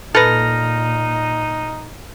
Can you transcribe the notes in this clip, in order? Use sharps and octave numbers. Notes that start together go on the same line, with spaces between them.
A#2 D#4 A4 B4 F6 A#6